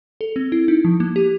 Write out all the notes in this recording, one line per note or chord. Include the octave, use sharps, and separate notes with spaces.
A4
C4
E4
D#4
F3
A#3
G4